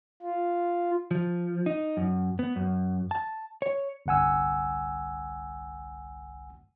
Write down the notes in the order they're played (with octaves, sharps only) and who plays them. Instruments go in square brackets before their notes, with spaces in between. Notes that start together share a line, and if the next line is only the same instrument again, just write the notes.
[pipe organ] F4
[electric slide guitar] F3
D#4
F#2
B3
F#2
A5
C#5
[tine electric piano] G1 C2 F#5 G#5 E6